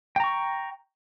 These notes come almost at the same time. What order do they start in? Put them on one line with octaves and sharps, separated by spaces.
G5 A#5 C#6